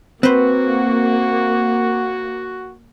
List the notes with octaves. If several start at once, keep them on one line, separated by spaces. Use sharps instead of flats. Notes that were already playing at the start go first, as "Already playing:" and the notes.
A#3 C4 F#4 B4 C5